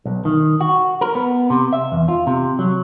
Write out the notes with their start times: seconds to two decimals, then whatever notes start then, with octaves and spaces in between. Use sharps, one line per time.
0.05 B1
0.25 D#3
0.61 F#4
1.01 A#4
1.15 B3
1.50 C3
1.73 E5
1.92 E2
2.08 F4
2.27 C3
2.59 F#3